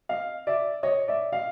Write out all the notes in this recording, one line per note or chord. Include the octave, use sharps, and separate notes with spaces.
D#5 F5
D5 E5
C#5 D#5
D5 E5
D#5 F5